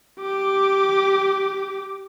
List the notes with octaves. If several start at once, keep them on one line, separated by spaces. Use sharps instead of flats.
G4 D6